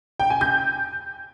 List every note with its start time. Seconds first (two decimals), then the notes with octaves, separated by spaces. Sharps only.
0.20 G5
0.30 G#5
0.41 G6